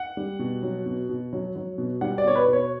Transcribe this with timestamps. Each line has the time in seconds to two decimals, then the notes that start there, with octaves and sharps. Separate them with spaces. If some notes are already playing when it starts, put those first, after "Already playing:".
Already playing: F#5
0.17 G3
0.39 B2
0.63 F#3
0.86 B2
1.09 B2
1.33 F#3
1.56 F#3
1.78 B2
2.01 G3 F#5
2.18 D5
2.24 B2 C#5
2.35 B4
2.48 B2 C#5